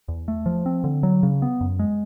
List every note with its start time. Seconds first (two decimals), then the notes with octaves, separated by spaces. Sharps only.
0.08 E2
0.28 A3
0.46 F3
0.66 C4
0.84 D3
1.03 F#3
1.23 C#3
1.42 B3
1.61 F#2
1.79 G#3